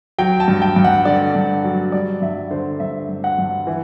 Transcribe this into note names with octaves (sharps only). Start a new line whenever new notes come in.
F#3 G5
A5
G2
G5
G2
F#5
D3 D5
G2
F#3
G3 D5
G2 E5
D3 C5
G2 E5
G2
F#5
G2
E3